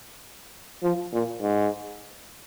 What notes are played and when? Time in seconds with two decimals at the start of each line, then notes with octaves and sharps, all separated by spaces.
0.83 F3
1.13 A#2
1.42 G#2